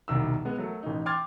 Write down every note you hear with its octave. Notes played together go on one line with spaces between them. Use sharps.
E1 C2 D#3 E6
G#3 B3
F#3 A3 A#4
A1 D#4
G5 C6 D6 F6 G#6 A6